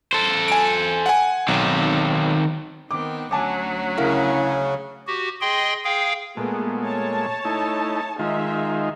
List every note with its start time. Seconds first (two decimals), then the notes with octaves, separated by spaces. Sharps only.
0.13 A4 C5
0.48 G#5 D7
1.06 F#5 G#5
1.48 B1 D#3 C4
2.91 D#3 B3 C4 D6
3.31 D2 F#3 C#4 G#5 A5 D6
3.98 C#3 E4 A#4 E5 F5
5.07 F#4 G4
5.41 G#4 D#5 G5 C6
5.84 G#4 F5 G5
6.37 A#2 G#3 A3 B3 G#4
6.82 C#5 A5
7.45 A3 D#4 E4
8.19 D#3 G#3 D#4 F4 E5